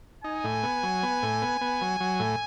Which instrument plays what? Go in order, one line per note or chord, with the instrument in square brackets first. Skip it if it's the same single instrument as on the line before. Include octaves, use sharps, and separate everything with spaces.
[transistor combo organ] D#4 [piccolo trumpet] G#5
[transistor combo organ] A2
B3
F#3
B3
A2
B3
B3
F#3
F#3
A2